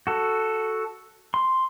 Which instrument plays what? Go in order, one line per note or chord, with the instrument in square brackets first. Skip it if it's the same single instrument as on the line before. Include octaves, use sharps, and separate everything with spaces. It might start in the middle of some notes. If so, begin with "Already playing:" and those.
[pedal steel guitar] F#4 A4
C6